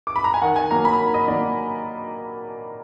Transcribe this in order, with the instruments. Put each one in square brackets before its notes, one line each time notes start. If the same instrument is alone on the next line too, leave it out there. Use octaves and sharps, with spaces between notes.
[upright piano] D6
B5
A#5
G#5
D#3 F#5
G#5
F#3 A#3 A#5
B5
D#3
D#5
F#3 A#3 D5